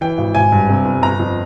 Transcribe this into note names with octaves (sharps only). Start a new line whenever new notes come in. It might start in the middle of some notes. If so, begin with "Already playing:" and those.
E3 G5
G#1
G#1 G#5
G2
C3
G1
G1 A#5
F2